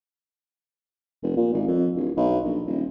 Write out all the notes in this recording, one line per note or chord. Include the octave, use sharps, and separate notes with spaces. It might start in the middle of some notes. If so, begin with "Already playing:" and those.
F1
A#2
G#1
F2
D1
B1
A#1
D#1